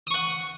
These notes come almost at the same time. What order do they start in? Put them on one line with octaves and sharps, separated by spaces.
D#6 C#6 F#5